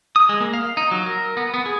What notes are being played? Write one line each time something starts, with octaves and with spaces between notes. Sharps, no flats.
D#6
G#3
A#3
F5
D#4
F#3
A#4
B3
B3
G#4